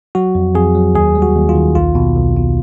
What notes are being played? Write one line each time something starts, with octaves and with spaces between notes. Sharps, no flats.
F#3 F#4
F2
F2 G#4
F#3
D#2 G#4
G3
F#4
D#2
F4
D#3
B1 F4
B2
B1
B2